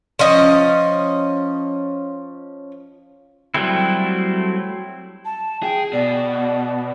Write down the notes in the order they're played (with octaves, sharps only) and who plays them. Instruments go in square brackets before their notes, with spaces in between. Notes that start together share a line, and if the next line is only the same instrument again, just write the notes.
[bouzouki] F3 C#4 D#5
[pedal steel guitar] F#3 G3 A3 C4 E4
[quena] A5
[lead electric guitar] G#4 [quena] G5
[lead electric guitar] B2 [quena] D5